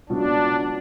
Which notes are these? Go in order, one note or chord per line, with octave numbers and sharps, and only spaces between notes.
C#2 B2 F#3 D4